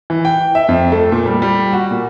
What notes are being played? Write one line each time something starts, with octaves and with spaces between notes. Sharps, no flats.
E3
G5
E5
F2
A3
A#2
G3
G3
F#4
A#2